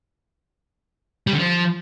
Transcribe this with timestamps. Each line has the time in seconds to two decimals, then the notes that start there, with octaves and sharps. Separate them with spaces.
1.27 G3
1.33 D3
1.39 F3